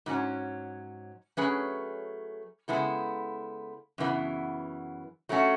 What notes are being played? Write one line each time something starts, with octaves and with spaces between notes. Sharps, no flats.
G#2 F#3 C#4
F#3 A3 C#4 G#4 B4
C#3 G#3 B3 E4 A4
F#2 C#3 E3 B3
F#3 A3 C#4 F#4